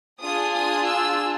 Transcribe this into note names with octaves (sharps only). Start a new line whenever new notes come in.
D4 F4 G#4 D#6
D#6
E6